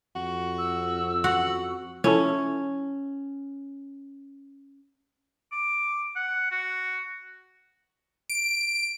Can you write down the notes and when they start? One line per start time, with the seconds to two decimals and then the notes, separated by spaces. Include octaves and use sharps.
0.16 F2 F#4
0.58 E6
1.24 F#4 F#5
2.04 F3 C#4 E4 A4
5.52 D6
6.16 F#5
6.51 F#4
8.30 D7